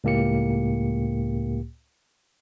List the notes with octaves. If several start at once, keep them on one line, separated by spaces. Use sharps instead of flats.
C#2 A2 A#3 G4 C#7